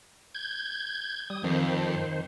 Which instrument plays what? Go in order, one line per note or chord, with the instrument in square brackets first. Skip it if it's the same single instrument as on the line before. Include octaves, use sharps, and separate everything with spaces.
[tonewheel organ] G6 G#6
G3 D#6
[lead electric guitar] F2 [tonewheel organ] D#3 C5